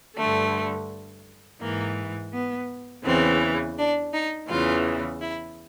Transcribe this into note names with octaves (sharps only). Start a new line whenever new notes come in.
G2 D3 A3
G#2 E3 A#3
B3
E2 C#3 E3 C4
D4
D#4
E2 C#3 E3 F4
E4